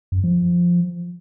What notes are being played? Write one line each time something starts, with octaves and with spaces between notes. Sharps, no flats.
F#2
F3